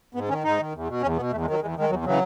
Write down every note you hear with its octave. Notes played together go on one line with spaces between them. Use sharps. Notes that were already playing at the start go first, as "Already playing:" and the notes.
G#2 B3
D#3 C#4
G#2 D#4
D#3
E2
B2
E2 C#4
B2 B3
E2 A3
G#3
D#3 F#3
E2 G#3
D#3 G#3
E2 F#3
C#3 E3 F#3